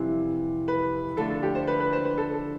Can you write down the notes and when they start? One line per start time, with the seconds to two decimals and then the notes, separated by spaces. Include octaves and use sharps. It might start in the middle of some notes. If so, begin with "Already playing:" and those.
Already playing: F2 C3 E3 G3
0.68 B4
1.17 D3 F3 A3 D4 A4
1.30 A4
1.43 G4
1.55 C5
1.67 B4
1.80 B4
1.93 C5
2.05 B4
2.17 A4
2.34 A4